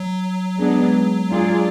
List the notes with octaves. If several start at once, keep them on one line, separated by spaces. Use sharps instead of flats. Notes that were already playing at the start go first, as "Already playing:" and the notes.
Already playing: F#3
G#3 B3 D4 G#4
G#3 D4 F4 G#4 D5